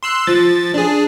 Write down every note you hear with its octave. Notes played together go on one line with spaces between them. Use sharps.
C6 E6 F#6
F3 A6
D4 G#4